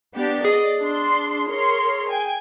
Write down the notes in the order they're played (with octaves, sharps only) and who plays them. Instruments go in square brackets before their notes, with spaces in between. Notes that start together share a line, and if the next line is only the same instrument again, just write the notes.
[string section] B3 D4 G4
[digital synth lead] G#4 [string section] D5 D#5
[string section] D4 C6
A#4 C#5 C6
G5 G#5